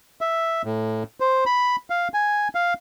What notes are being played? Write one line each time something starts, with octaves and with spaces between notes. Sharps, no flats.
E5
A2
C5
B5
F5
G#5
F5